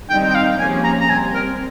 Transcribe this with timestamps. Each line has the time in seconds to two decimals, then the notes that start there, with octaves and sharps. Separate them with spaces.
0.10 D#3 G3 C4 D#4 G5
0.30 G5
0.35 F5
0.59 C3 F3 A#3 C#4 G#4 G#5
0.84 A#5
1.00 A#5
1.10 C3 G3 C4 G#5
1.34 A#4